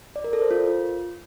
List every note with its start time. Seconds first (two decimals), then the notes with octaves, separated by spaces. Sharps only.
0.16 D5
0.24 A#4
0.33 A4
0.42 C5
0.51 F4